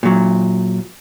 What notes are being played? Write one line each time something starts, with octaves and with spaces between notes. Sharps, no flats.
A#2 F#3